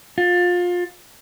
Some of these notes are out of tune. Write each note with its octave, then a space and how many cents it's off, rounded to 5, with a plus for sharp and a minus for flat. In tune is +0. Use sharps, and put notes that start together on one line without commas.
F4 +25